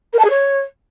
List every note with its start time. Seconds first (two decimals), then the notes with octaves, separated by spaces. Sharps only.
0.13 A#4
0.19 A5
0.24 G#4
0.30 C#5